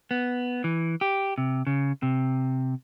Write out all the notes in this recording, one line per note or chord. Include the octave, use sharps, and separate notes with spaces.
B3
E3
G4
C3
C#3
C3